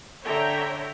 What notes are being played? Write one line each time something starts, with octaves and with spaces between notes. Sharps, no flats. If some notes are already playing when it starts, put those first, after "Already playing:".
D3 C#5 E5 G5 A#5